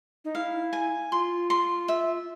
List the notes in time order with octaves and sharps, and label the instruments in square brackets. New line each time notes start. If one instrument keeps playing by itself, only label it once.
[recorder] D#4
[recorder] E4 [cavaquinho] F5
[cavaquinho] G#5
[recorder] F4 [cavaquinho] C6
[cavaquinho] C6
E5